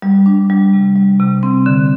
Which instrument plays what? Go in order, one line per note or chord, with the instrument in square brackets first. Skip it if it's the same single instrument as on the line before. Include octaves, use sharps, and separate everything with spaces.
[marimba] G3
D4
G3
C3
G3
C3
C4
D3